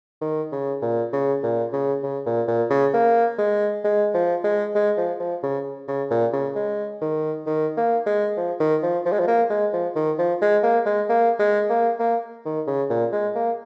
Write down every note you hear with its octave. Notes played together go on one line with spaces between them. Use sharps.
D#3
C#3
A#2
C#3
A#2
C#3
C#3
A#2
A#2
C#3
A#3
G#3
G#3
F3
G#3
G#3
F3
F3
C#3
C#3
A#2
C#3
G#3
D#3
D#3
A#3
G#3
F3
D#3
F3
F3
G#3
F3
A#3
G#3
F3
D#3
F3
G#3
A#3
G#3
A#3
G#3
A#3
A#3
D#3
C#3
A#2
G#3
A#3